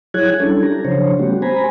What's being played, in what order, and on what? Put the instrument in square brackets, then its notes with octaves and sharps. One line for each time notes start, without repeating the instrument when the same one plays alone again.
[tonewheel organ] F#3 E4 G#4 C#5 F#6 G#6
G3 C#4 D4 E4 A4
G4 A4 A#5
C#3 F3 F#3 D4 C5 C#5
G3 A3 B3 C#4 F#4 G4
C5 G#5 A#5 B5